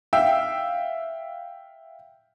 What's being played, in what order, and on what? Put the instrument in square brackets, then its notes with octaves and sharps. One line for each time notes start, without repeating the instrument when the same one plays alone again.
[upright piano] E5 F5 G5 E6